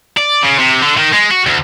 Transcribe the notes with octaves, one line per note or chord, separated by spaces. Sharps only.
D5
C#3
C3
D3
D#3
G#3
F#4
D2